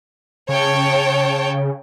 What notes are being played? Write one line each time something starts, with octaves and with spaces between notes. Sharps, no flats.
C#3 C#5 G5 A5